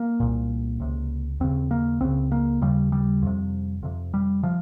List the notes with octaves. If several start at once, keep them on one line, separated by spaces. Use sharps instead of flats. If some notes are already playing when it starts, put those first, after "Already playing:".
Already playing: A#3
C2 A#2
C#2 C3
D#2 C#3 C4
A#3
C#2 C#3 C4
A#3
D#2 C#3 G3
G3
F2 C3
F2 C3
G3
C3 F3